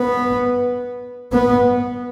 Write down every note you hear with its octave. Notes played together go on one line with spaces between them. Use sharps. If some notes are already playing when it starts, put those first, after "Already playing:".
Already playing: B3
B3